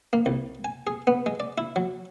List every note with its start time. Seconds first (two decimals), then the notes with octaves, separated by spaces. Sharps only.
0.13 A#3
0.26 C2
0.64 G#5
0.87 G#4
1.07 B3
1.26 G#3
1.40 D5
1.58 E4
1.76 F#3